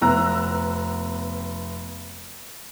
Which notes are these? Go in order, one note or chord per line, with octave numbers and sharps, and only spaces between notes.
F1 B3 A#5 E6 F#6